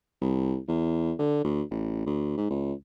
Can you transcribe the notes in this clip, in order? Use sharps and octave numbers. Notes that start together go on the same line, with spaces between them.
C2
E2
D3
D2
A1
D2
G#2
C#2